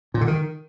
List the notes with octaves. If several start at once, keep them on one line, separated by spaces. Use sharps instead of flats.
A#2
D3
D#3